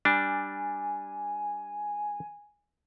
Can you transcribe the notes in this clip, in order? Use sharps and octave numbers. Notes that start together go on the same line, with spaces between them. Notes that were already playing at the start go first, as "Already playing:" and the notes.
G3 D4 G#5